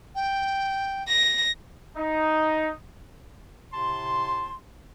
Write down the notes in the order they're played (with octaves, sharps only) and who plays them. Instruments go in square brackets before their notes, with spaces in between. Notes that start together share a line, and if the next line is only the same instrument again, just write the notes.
[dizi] G5
[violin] A#6
[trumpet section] D#4
[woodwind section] A2 C3 A5 C6